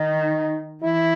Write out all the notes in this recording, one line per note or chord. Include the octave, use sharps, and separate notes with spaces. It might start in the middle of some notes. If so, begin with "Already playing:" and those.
Already playing: D#3 D#4
E3 E4